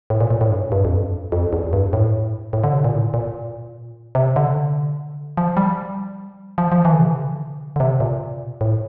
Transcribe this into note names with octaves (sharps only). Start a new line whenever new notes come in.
A2
A#2
A#2
A2
G2
G2
F2
G2
F2
E2
G2
A2
A2
D3
C3
A#2
A2
A#2
C3
D3
F3
G3
F3
F3
E3
D3
C3
D3
D3
C3
A#2
A2